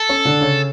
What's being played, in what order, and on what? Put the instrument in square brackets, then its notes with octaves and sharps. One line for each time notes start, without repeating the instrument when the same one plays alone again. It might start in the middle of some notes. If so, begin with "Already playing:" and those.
Already playing: [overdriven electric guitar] A4
[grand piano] C#4 C#5
D3 D4
C#3 C#4